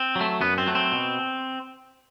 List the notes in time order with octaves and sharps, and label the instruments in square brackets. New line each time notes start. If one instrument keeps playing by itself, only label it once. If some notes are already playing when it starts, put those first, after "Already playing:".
Already playing: [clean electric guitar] C4
F#3
A3
F#2 B3
C4
F#3 A3
C4
B2